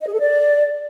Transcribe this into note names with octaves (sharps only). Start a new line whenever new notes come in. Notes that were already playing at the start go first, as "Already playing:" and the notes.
D#5
G#4
A4
D5